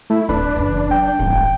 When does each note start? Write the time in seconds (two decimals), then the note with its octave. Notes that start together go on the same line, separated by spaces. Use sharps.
0.10 A3 E4
0.29 D1 D#2 D4 B4
0.56 F#1 E2
0.91 F#3 G5
1.19 D#1 G#1 F4